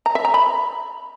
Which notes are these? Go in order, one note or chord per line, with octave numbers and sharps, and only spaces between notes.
A#5
E5
A#5
B5